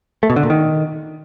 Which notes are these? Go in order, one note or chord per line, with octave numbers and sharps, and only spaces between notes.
A3
B2
D3
A#2
D#3